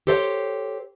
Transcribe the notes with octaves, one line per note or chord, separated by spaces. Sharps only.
G4 A4 C5 C#5 E5 G5